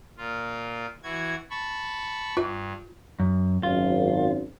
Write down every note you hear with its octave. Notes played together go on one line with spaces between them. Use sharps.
A#2 F4
E3 F#4 G#6
A5 B5 C#6
G2 F4
F#2
G#1 F#2 F4